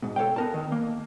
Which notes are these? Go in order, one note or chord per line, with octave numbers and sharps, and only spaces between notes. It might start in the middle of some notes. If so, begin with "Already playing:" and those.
G#2 B2
A4 C#5 F5 G5
B3 A#4 A5
D#3
A#3